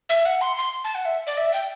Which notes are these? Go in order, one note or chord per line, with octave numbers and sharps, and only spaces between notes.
E5
F#5
C6
C6
A5
F#5
E5
D5
E5
G5